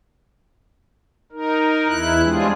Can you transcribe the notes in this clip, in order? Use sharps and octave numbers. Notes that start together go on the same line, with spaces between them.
D#4 A#4
E2 E4 F#6
G3 G#3 C4 D4 F4 G#4